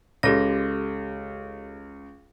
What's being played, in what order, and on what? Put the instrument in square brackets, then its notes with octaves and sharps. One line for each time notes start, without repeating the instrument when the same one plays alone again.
[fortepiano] C#2 [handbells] G4 A4 A#6